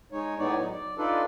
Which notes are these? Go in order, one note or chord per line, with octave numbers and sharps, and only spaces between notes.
G#3 D#4 C#5
A2 G#3 B3 D#4 C#5 D5
F#3 D#4
D5
D4 D#4 F4 A4 B4 D5